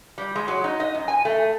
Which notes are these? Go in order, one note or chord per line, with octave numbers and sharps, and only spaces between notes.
G3
G#3
F#3
D#4
D#5
F#2
G#5
A3